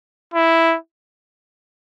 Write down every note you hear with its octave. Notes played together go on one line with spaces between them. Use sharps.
E4